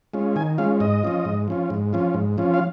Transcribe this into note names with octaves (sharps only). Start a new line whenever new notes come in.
G#3 C#4 F4
D#3 G#5
G#3 C#4 F4 F5
G#2 D#5
F3 C#4 F4
G#2
F3 C#4 F4
G#2
F3 C#4 F4
G#2
F3 C#4 F4
F5